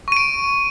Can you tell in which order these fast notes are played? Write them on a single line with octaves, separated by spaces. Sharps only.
C#6 D#7 D7